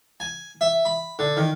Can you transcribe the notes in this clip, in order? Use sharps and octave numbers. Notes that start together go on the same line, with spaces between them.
G#5
E5
B5
D3
D#3